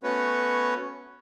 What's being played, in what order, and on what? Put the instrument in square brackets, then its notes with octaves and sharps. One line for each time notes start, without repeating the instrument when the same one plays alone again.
[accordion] A3 B3 C#4 F#4 B4 C#5